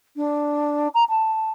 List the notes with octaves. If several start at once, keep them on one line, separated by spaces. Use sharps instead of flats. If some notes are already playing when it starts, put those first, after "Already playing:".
D4
A#5
A5